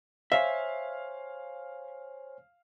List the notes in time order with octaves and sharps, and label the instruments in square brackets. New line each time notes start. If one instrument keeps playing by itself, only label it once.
[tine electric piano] C5 C#5 G#5 [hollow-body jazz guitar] E5 [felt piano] F5